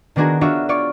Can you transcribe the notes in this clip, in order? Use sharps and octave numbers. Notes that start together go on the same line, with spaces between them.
D#3 B3 D4 F#4 G#4 A#4
D4 F4 F#4 C#5 E5
F4 C#5 D5 C#6